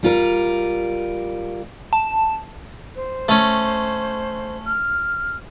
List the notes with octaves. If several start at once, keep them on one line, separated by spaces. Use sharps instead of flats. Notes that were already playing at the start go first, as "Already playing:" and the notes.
G3 F4 A#4
A5
C5
A3 C#4
F6